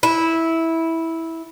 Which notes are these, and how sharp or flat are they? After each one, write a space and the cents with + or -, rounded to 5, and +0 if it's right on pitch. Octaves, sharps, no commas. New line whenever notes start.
E4 -10